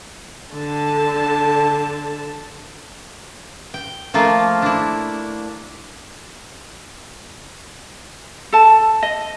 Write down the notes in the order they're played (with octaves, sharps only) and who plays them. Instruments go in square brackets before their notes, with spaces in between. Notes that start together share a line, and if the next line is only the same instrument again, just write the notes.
[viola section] D3 A5
[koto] G5
F3 A3 A#3 F4
D4 E4
[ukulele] A4 A5
D#5